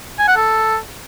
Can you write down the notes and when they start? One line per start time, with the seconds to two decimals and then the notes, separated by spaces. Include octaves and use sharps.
0.19 G#5
0.28 F#5
0.37 A4